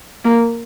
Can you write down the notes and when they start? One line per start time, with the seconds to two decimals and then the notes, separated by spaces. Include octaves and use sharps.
0.25 A#3